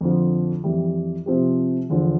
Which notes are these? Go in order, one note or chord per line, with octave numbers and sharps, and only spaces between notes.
F2 D3 F3
F2 E3 G3
C3 F3 C4 G4
E2 D3 F3